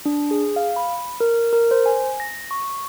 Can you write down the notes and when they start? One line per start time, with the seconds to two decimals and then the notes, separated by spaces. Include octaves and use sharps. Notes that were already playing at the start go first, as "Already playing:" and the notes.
0.06 D4
0.31 G#4
0.56 F5
0.76 B5
1.20 A#4
1.53 A#4
1.71 C5
1.86 G#5
2.20 A#6
2.51 C#6